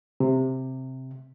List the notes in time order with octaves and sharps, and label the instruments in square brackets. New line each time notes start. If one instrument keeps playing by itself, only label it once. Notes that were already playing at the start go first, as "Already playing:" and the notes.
[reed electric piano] C3